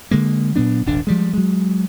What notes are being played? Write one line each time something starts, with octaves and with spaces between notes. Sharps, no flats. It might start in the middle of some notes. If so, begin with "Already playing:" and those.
D3 G#3 A#3
A#2 F#3 B3 D4
D#1 G#1 D4
F3 G3 G#3
F#3 G#3